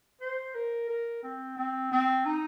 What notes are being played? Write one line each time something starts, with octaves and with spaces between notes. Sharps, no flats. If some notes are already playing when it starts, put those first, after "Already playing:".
C5
A#4
A#4
C4
C4
C4
D#4